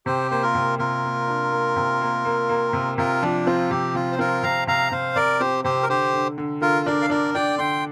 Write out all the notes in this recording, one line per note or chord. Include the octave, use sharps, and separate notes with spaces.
C3 G4 C5
A#3 C5
F4 A#4
C3
C3 F4 A#4
A#3
D4
A#3
C3
A#3
A#3
A#3
C3
C3 F4 A#4
F3 D4
C4 F4
C3 G4
C3 F4
C5
C4 F4 A#4
C3 F5 A#5
C3 F5 A#5
C3 C5 F5
C3 A#4 D5
C4 G4 C5
C3 G4 C5
A#4
D3 G4 C5
D3
D3
D3 F4 A#4
D4 A#4 D5
F5
D4 A#4 D5
D4 D5 G5
D3 G5 C6